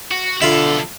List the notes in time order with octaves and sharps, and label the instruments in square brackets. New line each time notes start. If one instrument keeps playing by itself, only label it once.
[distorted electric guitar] F#4
[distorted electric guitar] B1 A4 [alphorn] D3 [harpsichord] E4 F4